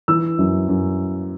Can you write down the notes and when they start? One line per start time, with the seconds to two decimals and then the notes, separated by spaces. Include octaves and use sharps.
0.08 E3 E6
0.39 F#2
0.68 F#2